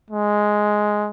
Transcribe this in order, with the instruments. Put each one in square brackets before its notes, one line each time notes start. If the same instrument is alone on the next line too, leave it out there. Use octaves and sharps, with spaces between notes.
[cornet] G#3